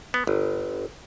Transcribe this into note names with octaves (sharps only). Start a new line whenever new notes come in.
B3
G1